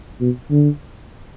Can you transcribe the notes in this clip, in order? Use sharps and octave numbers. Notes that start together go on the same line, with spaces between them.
B2
D3